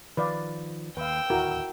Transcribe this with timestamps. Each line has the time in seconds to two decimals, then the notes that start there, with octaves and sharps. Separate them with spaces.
0.17 D#3 F3 B4 D5 F5
0.97 D#2 B4 F5 G5 E6
1.30 D1 D#2 E4 F#4 A#4